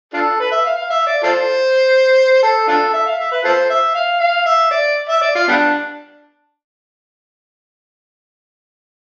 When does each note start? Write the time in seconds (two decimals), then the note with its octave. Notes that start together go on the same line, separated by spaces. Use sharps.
0.13 D4 F4 A4
0.40 B4
0.51 E5
0.64 F5
0.77 F5
0.90 E5
1.06 D5
1.23 F4 A4 C5
2.43 A4
2.68 D4 F4 A4
2.93 E5
3.06 F5
3.18 E5
3.31 B4
3.44 F4 A4 C5
3.70 E5
3.94 F5
4.20 F5
4.46 E5
4.71 D5
5.09 E5
5.21 D5
5.35 F4
5.48 G3 B3 D4